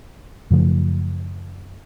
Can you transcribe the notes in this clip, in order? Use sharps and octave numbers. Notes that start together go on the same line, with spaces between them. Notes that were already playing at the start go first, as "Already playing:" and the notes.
F#2 C#3 F3 A3